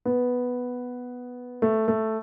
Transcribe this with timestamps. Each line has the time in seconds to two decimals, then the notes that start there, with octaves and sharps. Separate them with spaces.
0.05 B3
1.62 A3
1.88 A3